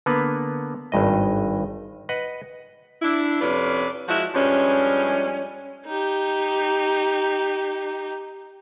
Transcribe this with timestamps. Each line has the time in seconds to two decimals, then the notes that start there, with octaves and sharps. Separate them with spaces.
0.06 D3 A#3 B3 B4
0.92 G#1 G2 D#5
2.09 B4 D#5 F#5
3.02 D4 E4
3.41 F2 C3 C#4 F4 B4 D5
4.09 F3 G#3 E4 F#4
4.35 G2 F3 G3 G#3 C#4
5.86 D#4 G4